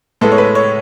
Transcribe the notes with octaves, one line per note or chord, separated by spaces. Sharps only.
A2 G#3 B3 A4
C#5
B4
C#5